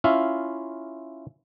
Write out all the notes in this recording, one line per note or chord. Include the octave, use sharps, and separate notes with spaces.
C#4 E4 F4 E5 F5